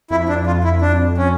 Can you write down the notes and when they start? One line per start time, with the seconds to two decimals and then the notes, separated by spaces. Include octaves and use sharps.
0.11 F2 E4
0.29 D4
0.47 F4
0.64 E4
0.81 D4
1.18 C#4